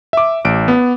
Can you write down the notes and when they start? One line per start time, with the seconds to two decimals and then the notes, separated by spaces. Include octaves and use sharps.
0.13 E5 D6
0.45 A1 D7
0.68 B3